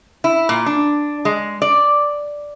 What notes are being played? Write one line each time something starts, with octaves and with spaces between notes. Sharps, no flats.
E4
A#2
D4
G#3
D5